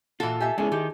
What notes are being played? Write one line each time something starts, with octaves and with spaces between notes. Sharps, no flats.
A#2 E3 F4 F#4 A4
G4 E5 G#5
G#3 B3 C#4 D4 E4 G#4 G#5
D#3 D#4 G4